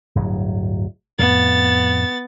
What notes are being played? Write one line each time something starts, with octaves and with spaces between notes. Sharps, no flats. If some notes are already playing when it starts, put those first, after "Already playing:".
D1 G1 F#3
F2 A2 B3 A6